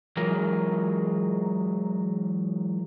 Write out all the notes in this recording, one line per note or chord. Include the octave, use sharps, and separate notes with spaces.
E3 F#3 G#3 F4 A#4